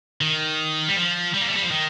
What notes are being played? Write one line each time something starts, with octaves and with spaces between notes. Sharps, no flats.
D#3
G3
F3
G3
A#3
A3
G3
F3
D#3